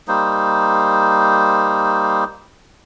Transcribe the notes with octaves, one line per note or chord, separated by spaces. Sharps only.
G3 A#3 D#4 C5